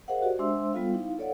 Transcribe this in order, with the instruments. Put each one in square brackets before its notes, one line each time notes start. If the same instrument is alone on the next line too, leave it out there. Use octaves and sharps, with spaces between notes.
[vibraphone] G#4 A#4 C5 D#5 F5 F#5
F#4 G4 C5 D5
G#3 D4 C5 E5 C6 E6
G3 B3 F4 A4 F5
D#4 E4 F5
A4 C#5 D5 F5 F#5